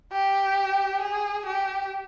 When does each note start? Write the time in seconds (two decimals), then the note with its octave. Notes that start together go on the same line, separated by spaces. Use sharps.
0.13 G4
1.01 G#4
1.46 G4